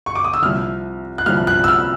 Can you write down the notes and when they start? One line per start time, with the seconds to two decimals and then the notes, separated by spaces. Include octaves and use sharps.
0.06 C#6
0.15 D6
0.24 D#6
0.34 E6
0.42 C2 C3 F3 F6
1.18 F#6
1.26 C2 C3 F3 F6
1.47 F#6
1.64 E6
1.68 F6